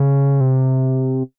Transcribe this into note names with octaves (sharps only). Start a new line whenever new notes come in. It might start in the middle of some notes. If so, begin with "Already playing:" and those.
Already playing: C#3
C3